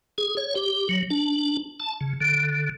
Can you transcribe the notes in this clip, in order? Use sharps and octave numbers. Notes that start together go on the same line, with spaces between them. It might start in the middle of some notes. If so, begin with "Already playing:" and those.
G#4
C#5
G4
F#3
D4
A5
C#3
D3